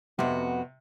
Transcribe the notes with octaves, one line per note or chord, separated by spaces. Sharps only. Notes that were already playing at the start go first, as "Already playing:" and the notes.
F2 C3 B3 F#4